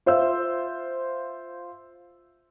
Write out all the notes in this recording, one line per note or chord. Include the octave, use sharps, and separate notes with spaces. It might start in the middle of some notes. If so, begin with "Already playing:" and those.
F4 C5 E5 F5 E6